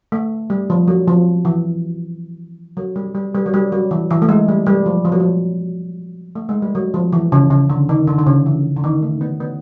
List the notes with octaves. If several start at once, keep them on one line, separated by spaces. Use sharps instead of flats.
A3
G3
F3
F#3
F3
E3
F#3
G3
G3
G3
F#3
G3
F#3
E3
E3
A3
G#3
G3
G3
F3
F3
F#3
F3
A3
G#3
G3
F#3
F3
E3
C#3
C#3
D3
D#3
D3
D3
C#3
E3
E3
D3
D#3
A3
B3
B3